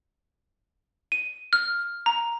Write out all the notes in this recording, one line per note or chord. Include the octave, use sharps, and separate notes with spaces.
D#7
F6
A#5